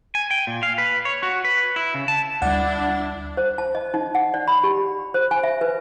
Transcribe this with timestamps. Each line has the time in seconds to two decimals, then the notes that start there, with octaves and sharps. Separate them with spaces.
0.15 G#5
0.31 G5
0.47 A#2
0.63 F5
0.78 B4
1.05 C#5
1.23 F#4
1.45 B4
1.76 E4
1.94 C#3
2.08 A5
2.42 D2 G3 D4 E4 D5 F#5
3.37 C5
3.58 A5
3.75 D#5
3.94 D#4
4.15 F#5
4.34 D5
4.48 B5
4.63 G4
5.14 C5
5.31 G#5
5.43 E5
5.61 B4